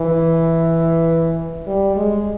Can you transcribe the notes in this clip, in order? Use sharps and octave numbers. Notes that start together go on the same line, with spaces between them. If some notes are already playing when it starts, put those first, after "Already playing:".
Already playing: E3
G3
G#3